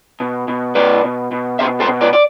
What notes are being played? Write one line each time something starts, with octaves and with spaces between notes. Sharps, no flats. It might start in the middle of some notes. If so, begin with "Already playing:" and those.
B2
B2
B2 B4 D5
B2
B2
B2 C5 E5
A4 C5
B2
B4 D5
D5